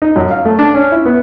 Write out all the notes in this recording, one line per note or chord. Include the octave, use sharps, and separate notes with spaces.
D#4
F#2
F5
A3
D4
C#4
E4
B3